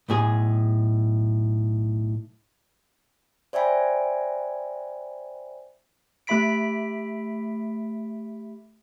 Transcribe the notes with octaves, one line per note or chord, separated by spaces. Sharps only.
B1 A2 G#4
C5 D5 E5 G5 G#5 B5
A3 G4 E5 B5 B6 D7